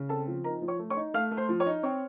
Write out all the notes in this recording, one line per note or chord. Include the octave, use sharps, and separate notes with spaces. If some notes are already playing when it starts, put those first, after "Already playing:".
Already playing: C#3
C4 A4 A5
F3
D#4 A#4 A#5
F3
C#5 C#6
A3
C#5 C#6
D#4
A3 F5 F6
A3
C5 C6
F3
C#5 C#6
D#4
C4 C#5 C#6